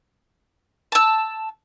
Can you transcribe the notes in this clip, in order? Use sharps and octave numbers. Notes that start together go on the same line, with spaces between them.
A5 E6